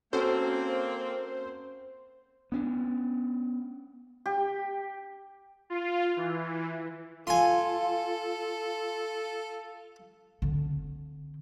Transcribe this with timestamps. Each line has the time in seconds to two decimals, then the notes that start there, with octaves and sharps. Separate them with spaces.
0.13 A#3 C4 C#4 F#4 A4 C5
2.52 B3 C#4 D4
4.26 G4
5.70 F4
6.17 E3
7.27 F4 A4 G#5 C6
10.42 D3 C4